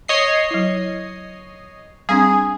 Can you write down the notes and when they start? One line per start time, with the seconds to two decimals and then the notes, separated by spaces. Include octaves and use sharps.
0.08 C#5 D#5 C7
0.51 F#3 E4
2.09 G3 C4 D4 G#4